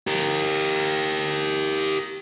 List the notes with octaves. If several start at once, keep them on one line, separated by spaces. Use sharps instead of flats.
G4 A#4